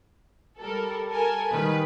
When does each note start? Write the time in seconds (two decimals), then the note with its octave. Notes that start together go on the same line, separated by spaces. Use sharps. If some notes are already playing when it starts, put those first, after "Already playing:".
0.58 G3 A4 A#4
1.08 A4 A#4 G#5
1.49 D#3 G3 B4